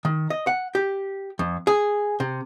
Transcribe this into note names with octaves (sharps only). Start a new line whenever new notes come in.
D#3
D#5
F#5
G4
F2
G#4
C3